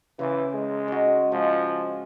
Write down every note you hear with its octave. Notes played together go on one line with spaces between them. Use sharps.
C#3 E3 C5 D6
G#3
F#4 D#5
F3 G#3